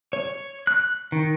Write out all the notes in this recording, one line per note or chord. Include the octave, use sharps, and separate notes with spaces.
C#5
F#6
D#3